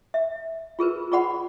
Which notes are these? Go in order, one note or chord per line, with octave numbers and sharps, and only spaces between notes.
E5
F4 G#4 A#4 B4
F4 G#4 D5 F#5 B5